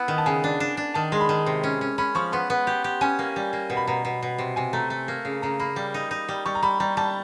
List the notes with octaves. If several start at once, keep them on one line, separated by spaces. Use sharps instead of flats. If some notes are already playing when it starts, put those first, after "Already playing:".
Already playing: B3 E4
D#3
A5
C#3 G#5
D4
D4
D4
D#3 A5
G#3 C6
B5
D#3
C3
C#4
C#4
C#4 B5
F3 C#6
B3 C6
B3
G4
G4
C#4 G#5
A#3
G3
A#3
B2
B5
B2 A#5
B2
B2
C3
C3 G#5
A3 A#5
A3
A#3
C#3
C#3 A#5
A#3 B5
G3
D#4
D#4
G3
G3 C#6
A#5
G3 B5
G3 A#5
G3 A5